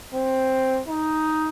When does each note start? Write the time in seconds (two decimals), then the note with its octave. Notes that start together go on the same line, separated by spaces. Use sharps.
0.14 C4
0.88 D#4